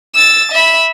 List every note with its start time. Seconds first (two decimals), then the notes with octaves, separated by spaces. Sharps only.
0.15 E6 A6
0.52 E5 B5